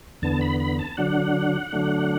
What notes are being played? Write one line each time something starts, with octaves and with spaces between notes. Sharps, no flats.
E2 D3 B3 A5
B5
B5
A5
D3 F#3 D4 F#5
D3 F#3 A3 D4